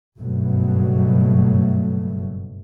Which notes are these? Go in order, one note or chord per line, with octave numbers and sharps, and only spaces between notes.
F#1 G2 B2 F#3 A3